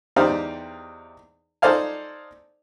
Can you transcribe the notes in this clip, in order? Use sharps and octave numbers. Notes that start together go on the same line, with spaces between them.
E2 D#4 G4 C5 D5 F5
D#4 A4 C5 D5 F5 G#5